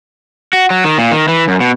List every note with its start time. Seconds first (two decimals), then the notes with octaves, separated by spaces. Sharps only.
0.53 F#4
0.70 F#3
0.85 D#3
0.98 A#2
1.11 D#3
1.28 E3
1.48 F#2
1.61 B2